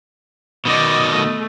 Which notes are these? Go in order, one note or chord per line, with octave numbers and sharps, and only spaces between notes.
B2 D#3 D5 D#5
A3